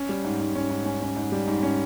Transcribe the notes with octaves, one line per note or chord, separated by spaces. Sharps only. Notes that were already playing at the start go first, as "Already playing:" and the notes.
Already playing: C#4
G3
G#2
G#2
C#4
G#2
C#4
C#4
G#2
G3
G#2
C#4